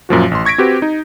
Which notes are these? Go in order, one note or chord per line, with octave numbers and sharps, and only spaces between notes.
F#2 A#2 F3 F#4
A1 C6
C#6 G#6 A#6 B6 D7
C4 F#4 G4 B4
D#4